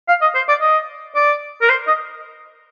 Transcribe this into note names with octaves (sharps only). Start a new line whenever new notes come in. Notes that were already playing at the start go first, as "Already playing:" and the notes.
F5
D#5
C5
D5
D#5
D5
A#4
C5
D#5